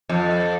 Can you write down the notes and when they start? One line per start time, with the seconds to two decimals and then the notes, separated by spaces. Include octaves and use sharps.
0.09 F2